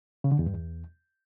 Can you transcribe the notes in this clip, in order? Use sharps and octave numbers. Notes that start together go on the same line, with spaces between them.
C#3
D3
E2
G2
E2